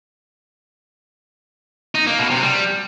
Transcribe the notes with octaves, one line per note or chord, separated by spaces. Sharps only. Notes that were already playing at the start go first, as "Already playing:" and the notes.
D#4
A#3
B2
C3
G3